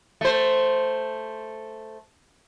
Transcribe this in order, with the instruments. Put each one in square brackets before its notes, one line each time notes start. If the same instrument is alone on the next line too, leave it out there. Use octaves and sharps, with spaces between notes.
[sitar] A3 C5